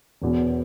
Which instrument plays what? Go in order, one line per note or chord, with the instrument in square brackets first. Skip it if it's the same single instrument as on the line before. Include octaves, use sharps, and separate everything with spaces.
[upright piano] E1 E2 B2